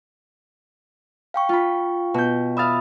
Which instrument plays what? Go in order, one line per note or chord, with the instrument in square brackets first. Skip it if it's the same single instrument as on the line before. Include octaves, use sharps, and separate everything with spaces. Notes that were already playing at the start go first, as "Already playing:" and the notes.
[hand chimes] F5 G5 C#6
[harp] F4 B5
B2 G6
[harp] E5 F5 [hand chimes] B5 D#6 A6